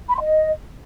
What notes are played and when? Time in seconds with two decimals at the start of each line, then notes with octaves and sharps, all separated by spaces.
0.09 B5
0.15 C6
0.21 D#5